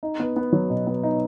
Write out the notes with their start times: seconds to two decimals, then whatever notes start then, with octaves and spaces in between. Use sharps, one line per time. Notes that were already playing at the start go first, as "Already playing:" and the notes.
0.03 D#4
0.20 B3
0.36 B3
0.53 F#3
0.70 B2
0.87 B3
1.03 D#4